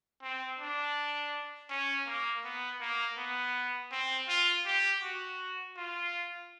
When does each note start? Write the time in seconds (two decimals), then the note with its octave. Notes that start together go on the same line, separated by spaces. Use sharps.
0.22 C4
0.59 D4
1.70 C#4
2.07 A#3
2.44 B3
2.80 A#3
3.17 B3
3.92 C4
4.28 F4
4.66 G4
5.03 F#4
5.77 F4